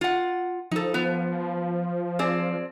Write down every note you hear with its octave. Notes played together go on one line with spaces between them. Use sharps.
F4 F#5
F3 D#4 A4
B3
C4 G#4 D5